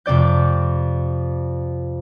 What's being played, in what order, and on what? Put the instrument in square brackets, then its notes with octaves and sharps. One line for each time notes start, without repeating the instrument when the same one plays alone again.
[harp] F2 C3 C4 D5 G6